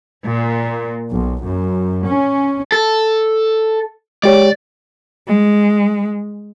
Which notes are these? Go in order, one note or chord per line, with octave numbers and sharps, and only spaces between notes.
A#2
B1
F#2
C#4
A4
G#3 G4 C#5 D5
G#3